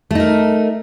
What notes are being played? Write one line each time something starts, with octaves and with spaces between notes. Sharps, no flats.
A3 D#4 A#4